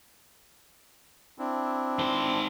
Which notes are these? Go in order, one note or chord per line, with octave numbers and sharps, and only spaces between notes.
C4 D4 E4
D#3 C5